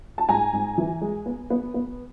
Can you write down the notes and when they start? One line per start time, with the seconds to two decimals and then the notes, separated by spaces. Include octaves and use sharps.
0.18 A5
0.29 G#2 G#5 A#5
0.53 G#2
0.78 E3
1.01 G#3
1.26 B3
1.50 B3
1.74 B3